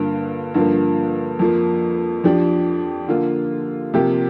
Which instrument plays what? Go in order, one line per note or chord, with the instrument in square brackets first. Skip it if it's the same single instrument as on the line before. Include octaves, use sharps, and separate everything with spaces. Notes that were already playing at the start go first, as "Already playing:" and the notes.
Already playing: [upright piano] G2 D3 A#3 F4
G2 D3 F3 A#3
F2 F3 A#3
F2 F3 D4 G4
D3 A#3 F4
C3 F3 A#3 G4